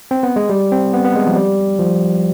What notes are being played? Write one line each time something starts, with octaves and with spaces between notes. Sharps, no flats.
C4
B3
G#3
G3
C4
B3
B3
G#3
F3
G3
F3